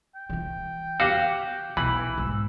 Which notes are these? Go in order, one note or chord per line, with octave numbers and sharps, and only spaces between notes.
G5
E3 F4
F#4 G4 F5
B1 E3 B5
G#2 E6